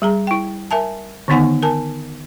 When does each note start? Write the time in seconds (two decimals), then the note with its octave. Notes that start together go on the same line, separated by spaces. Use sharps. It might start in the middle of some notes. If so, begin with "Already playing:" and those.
0.02 G3 G#4 A#5
0.27 E4 G5
0.71 A#4 E5 G#5 A5
1.28 D3 D#3 B3 D#4 F#5 G#5
1.63 A#4 G#5 A5